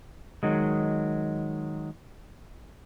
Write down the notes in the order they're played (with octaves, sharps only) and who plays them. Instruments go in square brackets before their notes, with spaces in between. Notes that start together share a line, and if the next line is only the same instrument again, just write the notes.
[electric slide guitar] D#3 F#3 G#3